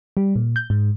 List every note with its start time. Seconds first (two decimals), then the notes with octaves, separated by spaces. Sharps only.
0.17 G3
0.36 A#2
0.56 G6
0.70 G#2